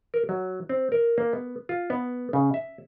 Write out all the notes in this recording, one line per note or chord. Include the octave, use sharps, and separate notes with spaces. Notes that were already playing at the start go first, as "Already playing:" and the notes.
A#4
F#3
C4
A#4
A#3
B3
F4
B3
C#3
E5